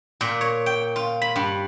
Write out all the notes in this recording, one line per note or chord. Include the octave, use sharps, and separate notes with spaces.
A#2
C#5
G5
F4
B5
G2